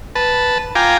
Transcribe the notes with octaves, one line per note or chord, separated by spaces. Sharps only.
B4 A5
F4 G5 G#5 A#5 D6